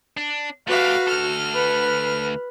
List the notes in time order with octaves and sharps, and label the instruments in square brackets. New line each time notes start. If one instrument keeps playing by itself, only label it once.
[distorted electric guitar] D4
[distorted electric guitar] A3 G4 [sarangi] F#4 [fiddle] B4 F5
[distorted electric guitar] D2 A4 [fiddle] F6
[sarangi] B4